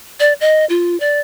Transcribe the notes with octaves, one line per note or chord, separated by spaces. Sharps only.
D5
D#5
F4
D5